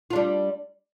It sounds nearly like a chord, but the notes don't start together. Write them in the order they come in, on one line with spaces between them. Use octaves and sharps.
F4 D4 G3